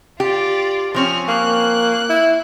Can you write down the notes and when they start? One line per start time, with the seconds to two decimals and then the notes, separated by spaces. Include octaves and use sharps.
0.20 F4 G4 D5
0.94 F3 C4 C#4 C#5 F6
1.28 A#3 F#6
2.10 E4